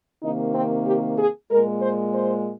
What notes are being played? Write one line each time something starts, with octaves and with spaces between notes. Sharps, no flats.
C3 D#3 A#3 D#4
C4
G4
G#4
A#2 G#3 A#4
C5
C5